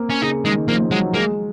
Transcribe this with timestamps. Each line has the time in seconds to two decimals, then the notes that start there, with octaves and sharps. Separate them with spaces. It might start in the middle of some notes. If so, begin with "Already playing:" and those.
Already playing: A#3 C4
0.10 C#4
0.22 C#3 D#4
0.45 D#3 G#3
0.68 F3 A#3
0.91 F#3 G#3
1.14 G#3 A#3